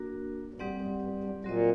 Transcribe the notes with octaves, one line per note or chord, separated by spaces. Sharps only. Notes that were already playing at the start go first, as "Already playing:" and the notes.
Already playing: A#3 D4 F#4 A#4
G2
A2 G3 C4 G4 D5 F#5
F#2
G2
G2
A#2 F#3 C4 F#4 C5 D#5